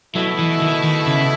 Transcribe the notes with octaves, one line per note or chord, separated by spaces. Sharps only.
B2 F#3 A3 E4
E3
D#3
D#3
C#3